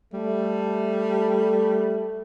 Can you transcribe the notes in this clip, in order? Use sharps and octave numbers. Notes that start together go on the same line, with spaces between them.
G3 A3